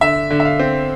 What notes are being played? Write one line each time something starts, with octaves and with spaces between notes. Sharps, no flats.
D3 E5
D3
E5
F5
C4